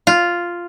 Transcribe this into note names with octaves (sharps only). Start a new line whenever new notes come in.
F4